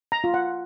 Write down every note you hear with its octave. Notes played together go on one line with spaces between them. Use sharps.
A#5
F4
F#5